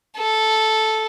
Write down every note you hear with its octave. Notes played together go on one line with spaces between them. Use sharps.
A4